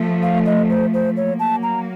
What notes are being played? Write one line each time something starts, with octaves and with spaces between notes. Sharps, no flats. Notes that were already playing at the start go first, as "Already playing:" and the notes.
Already playing: F3 A3
F5
D#5
C5
C5
F#3 A#3 C#5
A5
A#5